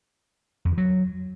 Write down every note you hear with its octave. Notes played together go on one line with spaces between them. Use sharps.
F2
D#3
F#3